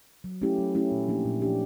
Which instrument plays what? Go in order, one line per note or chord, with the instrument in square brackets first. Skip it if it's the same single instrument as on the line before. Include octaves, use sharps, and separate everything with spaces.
[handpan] F#3
A3 C#4 E4 G4
F#3
A3 C#4 E4 G4
A#2
F3 A#3 D4 G4
A#2
F3 A#3 D4 G4